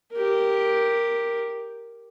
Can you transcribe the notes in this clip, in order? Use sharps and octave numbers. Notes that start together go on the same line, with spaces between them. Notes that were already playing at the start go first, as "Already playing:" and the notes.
G4 A#4